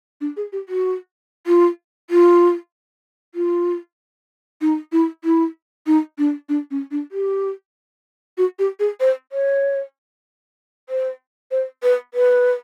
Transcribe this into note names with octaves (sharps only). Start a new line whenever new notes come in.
D4
G#4
G4
F#4
F4
F4
F4
D#4
E4
E4
D#4
D4
D4
C#4
D4
G4
F#4
G4
G#4
C5
C#5
C5
C5
B4
B4